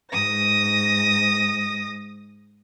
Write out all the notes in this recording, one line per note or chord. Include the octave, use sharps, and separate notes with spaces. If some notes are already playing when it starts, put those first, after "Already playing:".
G#2 D#6 A#6